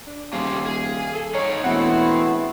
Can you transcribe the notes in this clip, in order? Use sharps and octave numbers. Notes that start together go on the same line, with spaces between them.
D4
D#1 G4 G#4 C5 F5
G#4
A4
D#4 G#4 A#4 C#5
E1 A3 B3 C4 E4 F#5